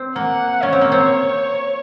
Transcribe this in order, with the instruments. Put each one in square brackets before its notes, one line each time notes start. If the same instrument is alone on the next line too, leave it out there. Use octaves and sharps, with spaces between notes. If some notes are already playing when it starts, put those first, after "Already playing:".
Already playing: [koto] C4
[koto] A#3 [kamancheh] F#5
[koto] C#4 [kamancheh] C#5
[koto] C4
A#3
C4